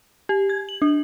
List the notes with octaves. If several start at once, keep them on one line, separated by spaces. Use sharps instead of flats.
G4
G#6
F#7
D4